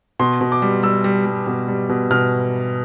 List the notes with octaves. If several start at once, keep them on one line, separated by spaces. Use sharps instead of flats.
B2 C6
B2
D6
G3
G3 E6
G3
G3
B2
G3
B2
B2 F6